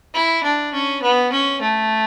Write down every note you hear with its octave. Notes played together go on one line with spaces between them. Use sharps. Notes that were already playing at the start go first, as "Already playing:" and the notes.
E4
D4
C#4
B3
C#4
A3